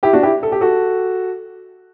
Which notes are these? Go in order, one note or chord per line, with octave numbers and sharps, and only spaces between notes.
E4 G4
D4 F#4
E4 G4
A4
G4
F#4 A4